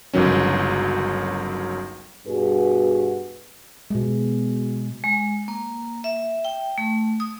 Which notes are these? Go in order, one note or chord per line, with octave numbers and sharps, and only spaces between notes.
G1 C#2 D#3 F#3 C#4
G2 B2 F#4 G#4 B4
B2 G#3
G#3
A#3
E5
G5
A3
D#6